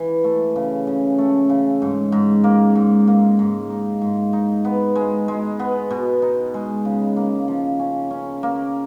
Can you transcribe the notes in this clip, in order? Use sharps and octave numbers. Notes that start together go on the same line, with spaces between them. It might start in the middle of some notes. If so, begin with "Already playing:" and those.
Already playing: E3
A3
C#3
C#3
A3
C#3
G#2
G#2
A#3
G#2
A#3
G#2
D#4
G#2
D#4
B3
G#3
G#3
B3
B2
D#4
G#3
C#3
A#3
F3
C#4
C#4
A#3